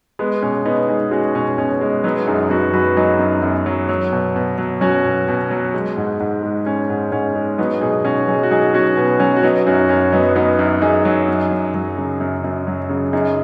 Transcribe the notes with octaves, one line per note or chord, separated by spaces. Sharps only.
G#3 B3
B2 C#4
B2 B3 D#4
G#3 D#4 G#4
G#3 C#4 F#4
B2 C#4
B2 C#4
G#3
F#3 B3 D#4
F#2 D#4 G#4
F#2 F#4 B4
F#3 F#4 B4
F#3 D#4 G#4
F#2
F#2
F#3
F#3
B2
B2
F#3
F#3 C#4 F#4
B2
B2
F#3
G#3
G#2
G#2
G#3
G#3 C#4
G#2
G#2 C#4
G#3
F#3 B3 D#4
B2 D#4 G#4
B2 C#4 F#4
F#3 D#4 G#4
F#4
F#3 D#4 G#4
B2 C#4 F#4
B2 B3
F#3 C#4
F#4
F#3 B3 D#4
F#2 C#4 F#4
F#2 C#4
F#3 B3 D#4
F#3 B3 D#4
F#2
F#2 D#4 G#4
F#3
F#2
F#2
F#3
C#3
F#2
F#2
F#3
C#3
F#2 D#4 G#4